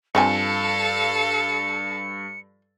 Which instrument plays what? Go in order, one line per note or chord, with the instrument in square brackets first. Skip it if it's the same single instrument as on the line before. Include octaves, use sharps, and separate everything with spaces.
[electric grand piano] G2 [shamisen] F3 C4 G#5 [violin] A4 F5 [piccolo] C#7